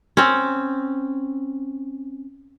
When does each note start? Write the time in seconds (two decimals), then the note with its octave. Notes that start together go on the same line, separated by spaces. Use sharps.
0.17 C4 C#4